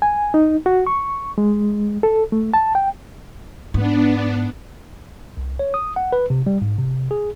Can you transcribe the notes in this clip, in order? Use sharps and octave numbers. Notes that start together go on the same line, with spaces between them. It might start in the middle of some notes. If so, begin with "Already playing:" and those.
G#5
D#4
F#4
C#6
G#3
A4
A3
A5
G5
G#2 B3 D4
C2
C#5
D#6
F#5
B4
C3
G3
G#2
C3
G#4